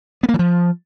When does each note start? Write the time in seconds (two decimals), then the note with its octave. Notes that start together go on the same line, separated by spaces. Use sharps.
0.23 B3
0.29 A#3
0.34 E3
0.39 F3